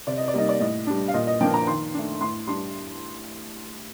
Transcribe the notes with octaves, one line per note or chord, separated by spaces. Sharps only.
C3 D5
D#5
D5
G3 A#3 D#4 D#5
D5
A2 D#5
G3 D4
F5
A#2 D#5
D#5
F3 A#3 D4 G5
A#5
D#3 C6
A3 D4
A2 C6
G3 D4 C6